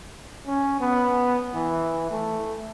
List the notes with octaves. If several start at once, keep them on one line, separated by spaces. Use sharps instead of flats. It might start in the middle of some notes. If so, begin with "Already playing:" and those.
C#4
B3
E3
A3